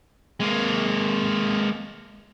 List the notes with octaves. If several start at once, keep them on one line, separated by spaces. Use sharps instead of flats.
G#3 A#3